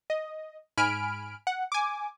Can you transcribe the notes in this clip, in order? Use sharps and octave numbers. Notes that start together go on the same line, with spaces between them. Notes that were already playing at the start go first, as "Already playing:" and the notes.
D#5
G#2 G#5 B5 F6 D7
F#5
G#5 D6